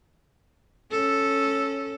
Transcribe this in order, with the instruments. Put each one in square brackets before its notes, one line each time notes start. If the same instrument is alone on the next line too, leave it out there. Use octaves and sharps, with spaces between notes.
[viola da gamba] C#4 A4